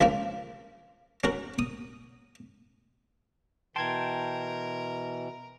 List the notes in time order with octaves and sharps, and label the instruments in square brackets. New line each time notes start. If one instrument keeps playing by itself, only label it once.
[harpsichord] C#2 C#3 F3 A#3
C#4 F#4 A#4
D#6
[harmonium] B2 E3 [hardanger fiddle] A#4 [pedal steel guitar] G5 A5 [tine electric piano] C6 G#6